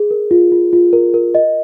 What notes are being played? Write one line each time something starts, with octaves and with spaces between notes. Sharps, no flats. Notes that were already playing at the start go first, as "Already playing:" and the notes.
Already playing: G#4
A#4
F4
F4
F4
A#4
A#4
D#5